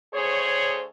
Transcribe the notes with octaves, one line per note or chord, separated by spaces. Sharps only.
D2 G#4 C5 C#5